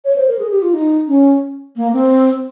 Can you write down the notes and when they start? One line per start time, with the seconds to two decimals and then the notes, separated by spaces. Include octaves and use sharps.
0.05 C#5
0.16 C5
0.28 A#4
0.39 G#4
0.51 G4
0.62 F4
0.74 D#4
1.08 C#4
1.76 A#3
1.93 C4